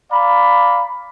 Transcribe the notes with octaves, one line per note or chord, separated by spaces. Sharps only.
D5 F5 A#5 B5